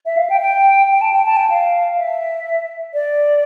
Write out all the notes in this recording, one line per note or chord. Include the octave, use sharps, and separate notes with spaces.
E5
F5
G5
G5
G5
A5
G5
A5
G5
F5
E5
D5